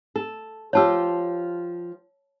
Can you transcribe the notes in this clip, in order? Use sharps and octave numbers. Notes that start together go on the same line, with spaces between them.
A4
F3 F4 G4 C#5 A5 E6